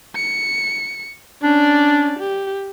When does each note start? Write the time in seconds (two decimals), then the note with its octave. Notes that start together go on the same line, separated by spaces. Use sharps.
0.15 C#7
1.43 C#4 D4 D5
2.19 G4